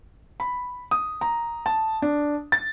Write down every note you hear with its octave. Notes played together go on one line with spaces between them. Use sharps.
B5
D#6
A#5
A5
D4
A6